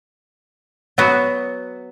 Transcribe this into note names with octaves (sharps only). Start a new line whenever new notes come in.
F#3 B3 F#4